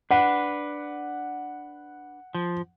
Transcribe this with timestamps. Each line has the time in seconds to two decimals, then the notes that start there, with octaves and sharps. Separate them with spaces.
0.11 D4 B4 F#5
2.34 F3